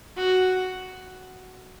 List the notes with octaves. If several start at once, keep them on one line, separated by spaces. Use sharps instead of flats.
F#4